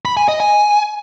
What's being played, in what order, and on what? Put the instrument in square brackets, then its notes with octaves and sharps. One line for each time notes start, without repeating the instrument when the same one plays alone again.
[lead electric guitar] B5
G#5
D#5
G#5